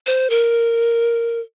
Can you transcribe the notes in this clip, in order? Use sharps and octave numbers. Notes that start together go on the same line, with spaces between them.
C5
A#4